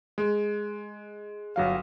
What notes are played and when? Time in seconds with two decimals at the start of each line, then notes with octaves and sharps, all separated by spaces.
0.18 G#3
1.56 G1 F#3 F5